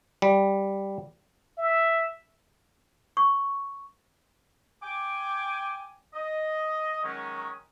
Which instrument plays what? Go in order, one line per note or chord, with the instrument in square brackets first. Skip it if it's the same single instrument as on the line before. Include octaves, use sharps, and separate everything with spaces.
[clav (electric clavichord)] G3
[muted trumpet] E5
[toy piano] C#6
[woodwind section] G5 G#5 D6
D#5
D#3 F#3 G#3 C#4